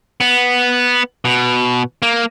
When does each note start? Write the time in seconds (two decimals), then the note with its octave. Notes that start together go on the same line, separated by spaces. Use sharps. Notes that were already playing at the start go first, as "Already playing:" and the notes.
0.21 B3
1.25 B2
2.02 A#3